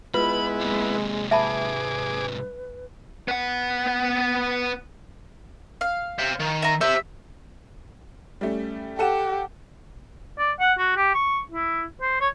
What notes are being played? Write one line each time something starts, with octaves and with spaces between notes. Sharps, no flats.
G#3 B3 E4 F4 B4 B5
G#2 C3
G#4 B4 E5 A5 B5 D6
B3 F#5
F5
C5 E5
D#3
E5 A#5
G4 C5 E5
G3 A3 C#4
G4 A4 F#5 E7
D5
F#5
F#4
G4
C#6
E4
C5
C#5